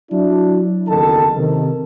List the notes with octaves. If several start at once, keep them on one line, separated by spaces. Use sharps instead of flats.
F#3 D4 E4
F#1 E2 D#3 A4 A5
C3 D#3